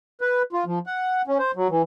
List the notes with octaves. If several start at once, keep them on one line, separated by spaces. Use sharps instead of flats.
B4
F4
F3
F#5
C#4
C5
F#3
E3